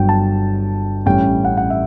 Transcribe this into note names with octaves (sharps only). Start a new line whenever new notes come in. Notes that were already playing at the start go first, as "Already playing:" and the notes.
Already playing: G1 G2 F#3 G5
A5
A1 A2 G3 C#4 G5
F#5
F#5
E5